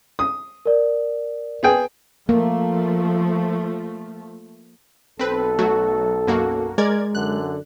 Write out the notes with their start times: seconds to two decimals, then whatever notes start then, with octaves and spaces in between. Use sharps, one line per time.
0.19 D#6
0.65 A#4 D5
1.63 B3 G#4 G5
2.29 F3 A3 A#3
5.19 B1 C4 A4 B4
5.59 F#3 A3 F#4
6.27 F#2 A#3 F#4
6.78 G#3 A#4 D5 G#6
7.15 F#2 D3 F#6